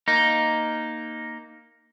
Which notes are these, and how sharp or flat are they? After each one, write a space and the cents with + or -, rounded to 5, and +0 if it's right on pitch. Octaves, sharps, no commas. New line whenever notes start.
A#3 +0 D#4 +0